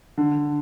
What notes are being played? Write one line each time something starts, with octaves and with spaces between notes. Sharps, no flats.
D3